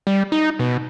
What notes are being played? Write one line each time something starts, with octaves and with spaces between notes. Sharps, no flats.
G3
D#4
B2